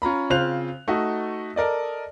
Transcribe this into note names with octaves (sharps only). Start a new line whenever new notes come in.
C#4 F4 A#5 B5
C#3 C4 F4 C5 F#6 F7
A3 D#4 F#4
A4 A#4 D5 D#5